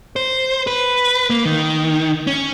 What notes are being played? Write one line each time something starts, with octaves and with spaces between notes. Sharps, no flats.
C5
B4
A#3
D#3
C#4